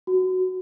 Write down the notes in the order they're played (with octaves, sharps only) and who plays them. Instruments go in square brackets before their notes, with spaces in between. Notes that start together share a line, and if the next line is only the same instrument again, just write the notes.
[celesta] F#4